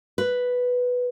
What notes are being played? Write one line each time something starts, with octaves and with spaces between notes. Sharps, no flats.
B4